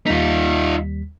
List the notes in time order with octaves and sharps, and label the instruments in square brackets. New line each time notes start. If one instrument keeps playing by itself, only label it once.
[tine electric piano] D#2 G3 B6 [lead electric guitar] D#4 F4